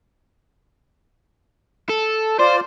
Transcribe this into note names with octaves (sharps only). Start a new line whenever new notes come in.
A4
F4 C5 D5